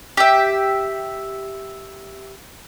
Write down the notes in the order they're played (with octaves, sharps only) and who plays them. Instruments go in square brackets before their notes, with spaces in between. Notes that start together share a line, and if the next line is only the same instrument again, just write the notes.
[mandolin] G4 E5